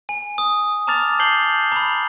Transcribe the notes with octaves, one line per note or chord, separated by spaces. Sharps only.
G#5
D#6
A5 A#5 D6 F6 A6 F7
A5 G6 C7 F#7 G7
A#5 B5